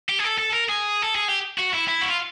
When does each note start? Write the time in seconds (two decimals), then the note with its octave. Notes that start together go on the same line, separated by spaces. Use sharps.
0.09 G4
0.19 G#4
0.24 A4
0.38 A4
0.53 A#4
0.69 G#4
1.02 A4
1.15 G#4
1.28 G4
1.58 F#4
1.73 E4
1.88 E4
2.01 F#4
2.10 F4